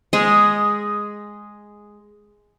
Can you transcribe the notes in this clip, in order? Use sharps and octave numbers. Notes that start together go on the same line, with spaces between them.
G#3 G#4